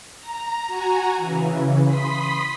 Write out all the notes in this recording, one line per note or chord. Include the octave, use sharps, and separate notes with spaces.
A#5
F#4 G#5 A#5
C#3 E3
B5 C6 D#6 B6